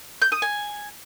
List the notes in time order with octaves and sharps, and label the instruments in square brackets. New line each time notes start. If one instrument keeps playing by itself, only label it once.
[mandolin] G6
D#6
G#5